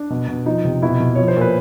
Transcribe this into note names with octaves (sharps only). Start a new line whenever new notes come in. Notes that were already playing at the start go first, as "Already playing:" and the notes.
Already playing: D4
B2
B2
F3 D#4
C3
B2 E4
B2
F3 C#5
C5
A#2 B4